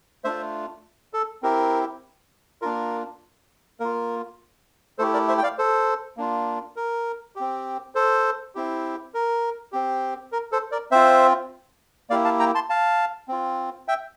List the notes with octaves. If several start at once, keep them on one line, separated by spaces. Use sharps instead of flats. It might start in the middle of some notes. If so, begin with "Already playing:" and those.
A3 D4 F4 C5 E5
A4
C4 E4 G4 A#4
A#3 D4 F4 A#4
A#3 F4 A#4
A3 E4 G4 A4 C5
A#4 D5
C5 E5
G5
D5 F5
A4 C5
A#3 D4 F4
A#4
C4 G4
A4 C5
C4 E4 G4
A#4
C4 G4
A#4
A4 C5
A#4 D5
C4 F4 C5 E5
A#3 E4 G4 D5 F5
F5 A5
G5 A#5
A5 C6
F5 A5
C4 F4
E5 G5